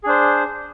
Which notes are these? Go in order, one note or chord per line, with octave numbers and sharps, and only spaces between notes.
D4 G#4 C5